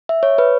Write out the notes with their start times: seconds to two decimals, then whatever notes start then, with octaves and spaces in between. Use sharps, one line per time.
0.09 E5
0.23 C#5
0.38 B4